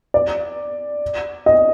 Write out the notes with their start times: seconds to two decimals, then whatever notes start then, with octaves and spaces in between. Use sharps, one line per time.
0.14 D5
1.46 D#5